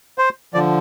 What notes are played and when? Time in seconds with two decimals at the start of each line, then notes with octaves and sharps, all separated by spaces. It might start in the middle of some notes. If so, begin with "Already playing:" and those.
0.18 C5
0.54 D3 F3 D5